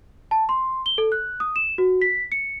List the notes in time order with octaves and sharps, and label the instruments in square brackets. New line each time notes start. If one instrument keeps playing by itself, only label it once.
[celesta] A5
C6
G7
A4
F#6
D#6
E7
F#4
B6
C#7